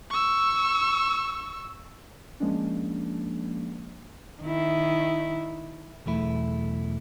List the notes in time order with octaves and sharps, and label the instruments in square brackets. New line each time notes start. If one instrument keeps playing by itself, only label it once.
[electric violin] C#6 E6
[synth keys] F3 G#3 A#3 C#4 D4
[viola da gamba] D#3 E4
[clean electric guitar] B1 E2 A3 E4